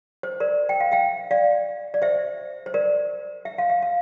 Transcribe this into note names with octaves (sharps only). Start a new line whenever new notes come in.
C5
A#4 D5
G5
F5
E5 G5
D5 F5
D5
C5 E5
C5
A#4 D5
E5
F5
E5
F5